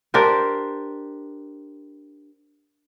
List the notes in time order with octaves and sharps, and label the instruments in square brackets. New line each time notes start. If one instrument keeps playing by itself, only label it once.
[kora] D4 G4 A#4 C5